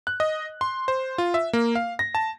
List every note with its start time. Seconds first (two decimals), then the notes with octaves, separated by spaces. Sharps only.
0.07 F#6
0.20 D#5
0.61 C6
0.88 C5
1.18 F4
1.34 E5
1.53 A#3
1.75 F5
1.99 A#6
2.15 A5